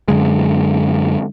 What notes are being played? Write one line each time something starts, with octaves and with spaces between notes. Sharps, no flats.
F#2 D3 G#3